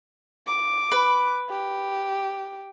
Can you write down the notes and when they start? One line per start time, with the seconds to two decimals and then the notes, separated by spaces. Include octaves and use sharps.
0.47 D6
0.92 B4
1.50 G4